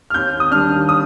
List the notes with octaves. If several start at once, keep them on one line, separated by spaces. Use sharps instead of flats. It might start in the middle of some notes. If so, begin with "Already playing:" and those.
F6
D#2 G6
D#6
D#3 G3 D4 F6
D#6